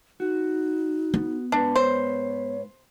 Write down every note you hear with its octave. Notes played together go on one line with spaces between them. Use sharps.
D#4 F#4
B3
G#2 D4 B4
C5 C#5